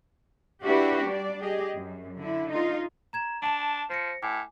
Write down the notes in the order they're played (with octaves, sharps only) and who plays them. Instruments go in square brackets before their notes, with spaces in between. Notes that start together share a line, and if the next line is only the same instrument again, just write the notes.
[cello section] D4 E4 F#4 G4 B4
G3 D4 D5
G4 G#4 D#5
F#2
D3 E4
D#4 F4
[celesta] A#5 G#6 E7
[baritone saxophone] D4 [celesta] A5 E7
[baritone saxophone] F3 [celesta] C5 A#6 C#7
[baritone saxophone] A2 [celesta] G#5 D6